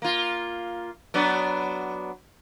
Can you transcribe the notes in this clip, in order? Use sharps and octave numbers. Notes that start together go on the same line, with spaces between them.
A#3 F4
F#3 B3 D4